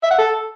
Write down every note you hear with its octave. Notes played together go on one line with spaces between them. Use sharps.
E5
F#5
A4